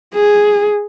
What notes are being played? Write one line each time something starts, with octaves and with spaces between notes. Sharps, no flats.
G#4